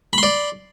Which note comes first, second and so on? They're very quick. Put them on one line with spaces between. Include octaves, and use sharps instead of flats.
B5 C6 D5